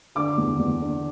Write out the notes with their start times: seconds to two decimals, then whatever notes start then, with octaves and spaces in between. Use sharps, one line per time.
0.15 D3 D6
0.38 E2
0.59 E2
0.81 D3